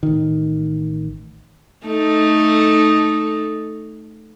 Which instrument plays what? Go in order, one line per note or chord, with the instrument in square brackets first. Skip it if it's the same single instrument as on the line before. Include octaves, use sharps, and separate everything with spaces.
[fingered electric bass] A1 D#3
[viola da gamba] A3 D#4 A4